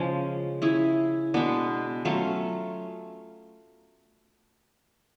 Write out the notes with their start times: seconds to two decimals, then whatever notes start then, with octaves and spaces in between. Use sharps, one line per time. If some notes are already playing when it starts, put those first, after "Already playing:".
Already playing: C#3 F3 G#3 C#4
0.62 C#4 E4 G#4
1.34 B2 G#3 B3 D4
2.05 F#3 A3 C#4 F4